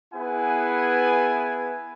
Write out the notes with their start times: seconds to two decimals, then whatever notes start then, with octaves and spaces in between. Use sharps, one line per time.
0.14 B3 E4 G#4 B4 F#5 G#5